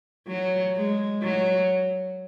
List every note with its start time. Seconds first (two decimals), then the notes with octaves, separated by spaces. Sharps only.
0.27 F#3
0.75 G#3
1.23 F#3